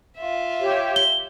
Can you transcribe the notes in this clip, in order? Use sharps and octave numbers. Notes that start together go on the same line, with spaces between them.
F4 E5
G4 C#5
G7